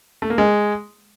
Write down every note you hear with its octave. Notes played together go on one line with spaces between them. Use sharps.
A3
A#3
G#3